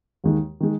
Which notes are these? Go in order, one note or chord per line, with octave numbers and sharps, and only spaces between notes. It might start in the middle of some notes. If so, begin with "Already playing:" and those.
D#2 D#3 G#3
D#3 G#3